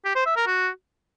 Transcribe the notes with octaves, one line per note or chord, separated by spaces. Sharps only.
G4
C5
E5
A#4
F#4